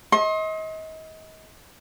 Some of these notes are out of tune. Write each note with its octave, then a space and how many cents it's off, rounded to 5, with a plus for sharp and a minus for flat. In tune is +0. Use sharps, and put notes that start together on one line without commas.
D#5 +35 C6 +35